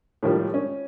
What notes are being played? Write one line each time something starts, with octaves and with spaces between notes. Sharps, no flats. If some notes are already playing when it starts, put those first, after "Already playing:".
A2 D#3 F3 G3
C#4